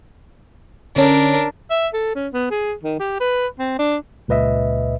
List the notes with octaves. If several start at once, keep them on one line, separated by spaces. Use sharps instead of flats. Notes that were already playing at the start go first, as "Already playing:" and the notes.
D3 C#4 D4 A#4
E5
A4
C#4
B3
G#4
D#3
G4
B4
C4
D4
C#2 A#2 B4 D#5 E5